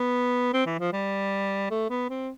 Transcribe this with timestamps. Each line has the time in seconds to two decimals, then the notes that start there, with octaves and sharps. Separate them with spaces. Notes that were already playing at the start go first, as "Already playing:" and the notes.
Already playing: B3
0.54 C4
0.66 E3
0.79 F3
0.93 G3
1.71 A3
1.90 B3
2.10 C4